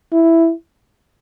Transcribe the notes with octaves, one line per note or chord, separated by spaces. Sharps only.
E4